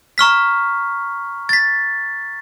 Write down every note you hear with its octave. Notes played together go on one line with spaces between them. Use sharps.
A#5 C#6 F6 B6
A6 B6